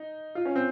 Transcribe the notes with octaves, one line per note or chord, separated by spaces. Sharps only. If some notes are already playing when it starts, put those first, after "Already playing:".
Already playing: D#4
F4
C#4
C4